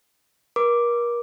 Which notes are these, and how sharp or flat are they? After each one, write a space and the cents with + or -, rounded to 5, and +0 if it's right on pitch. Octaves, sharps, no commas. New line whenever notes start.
A#4 +35 D6 +0